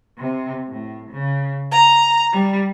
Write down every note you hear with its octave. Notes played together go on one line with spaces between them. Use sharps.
C3
A2
C#3
A#5
G3